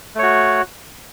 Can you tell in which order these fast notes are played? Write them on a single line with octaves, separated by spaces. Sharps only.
A3 C#5 F#4